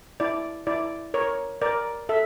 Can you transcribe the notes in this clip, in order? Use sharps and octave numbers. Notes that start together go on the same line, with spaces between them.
E4 D5
E4 D5
A#4 C#5
A#4 D5
A4 E5